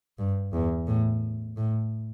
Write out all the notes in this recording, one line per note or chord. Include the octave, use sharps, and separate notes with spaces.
G2
E2
A2
A2